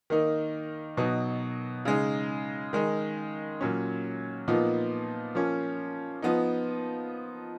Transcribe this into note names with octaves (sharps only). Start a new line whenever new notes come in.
D#3 A#3 D#4
B2 F#3 B3 D#4
C#3 G#3 D#4
D#3 G#3 D#4
A#2 F#3 C#4
A#2 F3 B3 D#4
F3 A#3 C#4
F3 B3 D#4